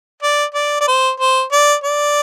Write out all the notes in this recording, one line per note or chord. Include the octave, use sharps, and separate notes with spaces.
D5
D5
D5
C5
C5
D5
D5